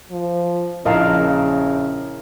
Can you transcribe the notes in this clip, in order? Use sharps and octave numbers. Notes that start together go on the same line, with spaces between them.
F3
A#1 C#3 E4 A#4 D#5 F5 A5